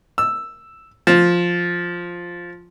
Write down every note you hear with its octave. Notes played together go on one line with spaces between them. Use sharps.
E6
F3